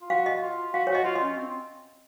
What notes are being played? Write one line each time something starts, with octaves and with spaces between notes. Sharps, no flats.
F4
F#4 F5
D#5
F4
F#4 F5
C#5
F#4 D#5
F4
D#5
C#4
C4